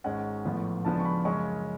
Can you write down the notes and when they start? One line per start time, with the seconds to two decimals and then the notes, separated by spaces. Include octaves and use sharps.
0.04 G#1 G#2 G#3 C#4 F#5
0.45 A1 A2 F3 B3
0.85 C#2 C#3 F3 B3 D4 A5
1.00 C#6
1.05 B5
1.25 F#2 C#3 G#3 C#4 C#6